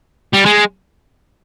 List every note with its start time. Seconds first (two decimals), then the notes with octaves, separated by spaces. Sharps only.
0.33 G3
0.45 G#3